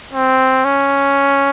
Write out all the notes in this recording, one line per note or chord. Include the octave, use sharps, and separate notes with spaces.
C4
C#4